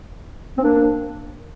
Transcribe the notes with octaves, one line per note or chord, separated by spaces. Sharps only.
C4
A#3 D4